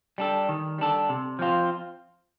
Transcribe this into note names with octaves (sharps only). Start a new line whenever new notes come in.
G3 D4 A4
D#3
G3 D4 A4
C3
F3 C4 F4